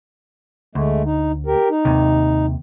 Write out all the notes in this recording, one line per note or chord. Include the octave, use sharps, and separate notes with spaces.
D2 G#3 A3
D#4
G4 A#4
D#4
D#2 C3